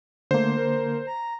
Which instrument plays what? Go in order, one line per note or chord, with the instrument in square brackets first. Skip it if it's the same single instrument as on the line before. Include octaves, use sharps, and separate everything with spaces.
[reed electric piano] D3 A#3 [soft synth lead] A3 [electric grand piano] C5
[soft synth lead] A#4
A#5